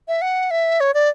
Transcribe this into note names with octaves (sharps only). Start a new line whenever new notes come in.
E5
F#5
E5
C#5
D5